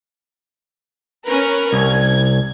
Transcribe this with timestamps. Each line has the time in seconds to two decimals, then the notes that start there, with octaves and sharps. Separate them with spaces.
1.26 C#4 A#4 B4
1.73 C2 G#6